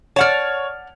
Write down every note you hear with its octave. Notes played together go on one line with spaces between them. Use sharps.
C#5 D5 F#5 A5 F6